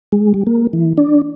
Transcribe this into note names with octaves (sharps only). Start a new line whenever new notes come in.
G#3
G3
A#3
E3
D4